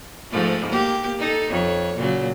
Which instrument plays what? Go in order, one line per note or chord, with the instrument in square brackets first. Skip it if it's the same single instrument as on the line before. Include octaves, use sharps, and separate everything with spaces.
[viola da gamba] G#2 F3 A3
A#3 G4
D#4 A4
F2 C#5
A#2 C#3 F#3